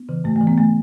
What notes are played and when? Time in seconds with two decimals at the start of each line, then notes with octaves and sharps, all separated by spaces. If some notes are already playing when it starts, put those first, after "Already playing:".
Already playing: B3
0.09 C#3 E3
0.24 G#2 A3
0.36 A3
0.41 E3
0.47 B3
0.58 A3